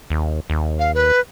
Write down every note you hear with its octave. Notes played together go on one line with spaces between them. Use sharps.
D#2
D#2
F5
B4